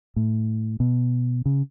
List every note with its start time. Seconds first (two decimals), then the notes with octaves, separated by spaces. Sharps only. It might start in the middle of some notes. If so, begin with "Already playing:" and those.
0.16 A2
0.80 B2
1.46 C#3